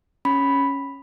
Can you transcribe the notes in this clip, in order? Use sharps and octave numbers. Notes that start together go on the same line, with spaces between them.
C#4 B5